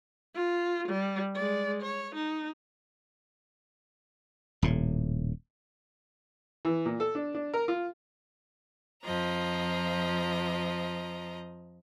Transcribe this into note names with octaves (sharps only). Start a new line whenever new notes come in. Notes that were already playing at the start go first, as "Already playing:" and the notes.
F4
G3
G#3 D5
C#5
D#4
D#1 A2
E3
A#2
A4
D4
D4
A#4
F4
F2 F3 D#5 A#5